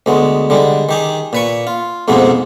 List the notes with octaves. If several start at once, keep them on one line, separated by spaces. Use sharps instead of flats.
D2 G#3 B3
D3 G3 G#3
D#3 G4 G#4
A#2 B4 C#6
F4
F2 G#2 B2 G#3 A#3 B3